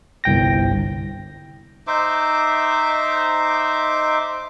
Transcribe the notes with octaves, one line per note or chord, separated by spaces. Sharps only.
G1 C2 G5 A#6
D#4 C5 E5 D6